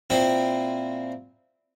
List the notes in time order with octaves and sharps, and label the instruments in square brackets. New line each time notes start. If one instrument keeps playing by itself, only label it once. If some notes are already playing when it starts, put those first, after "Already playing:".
[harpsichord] A#2 C4 E4